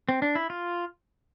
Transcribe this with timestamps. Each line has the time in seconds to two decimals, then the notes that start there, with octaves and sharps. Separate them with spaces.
0.09 C4
0.22 D4
0.35 E4
0.50 F4